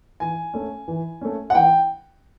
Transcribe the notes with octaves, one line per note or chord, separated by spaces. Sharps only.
E3 G#5
A3 C#4
E3
A3 C#4
F#5
E3 G5